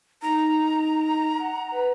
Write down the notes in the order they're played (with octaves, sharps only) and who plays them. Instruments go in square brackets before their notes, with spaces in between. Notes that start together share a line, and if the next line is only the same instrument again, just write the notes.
[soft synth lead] D#4 [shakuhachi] A#5
[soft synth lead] F#5
B4